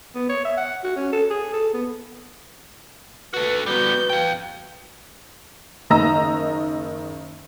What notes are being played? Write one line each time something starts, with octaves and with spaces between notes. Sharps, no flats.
B3
C#5
E5
F#5
F#4
C#4
A4
G#4
A4
B3
F#4 A4 B4
G3 B3 F#4 B4 G6
F5 G5
F#1 D#3 D#5 A#5 E6 A#6